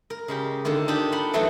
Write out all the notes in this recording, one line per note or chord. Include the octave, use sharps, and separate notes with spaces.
A#4
C#3 G#3 G4
D3 D#3 A#3 F4
D4 D#4 F4 G4
F4 F#5 B5 C6
E3 F#3 A3 D#4 F4 A#4